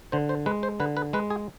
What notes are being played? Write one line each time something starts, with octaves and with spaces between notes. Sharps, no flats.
D3 C5
C5
G#3 B4
C5
D3 B4
B4
G#3 B4
G#4